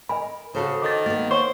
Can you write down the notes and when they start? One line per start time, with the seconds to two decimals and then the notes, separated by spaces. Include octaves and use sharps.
0.09 A#4 D#5 G#5 B5
0.55 C#3 F#4 A4 C5
0.82 D#3 D6 A6
1.06 A#3 B3 A6
1.31 C5 C#5 C6 C#6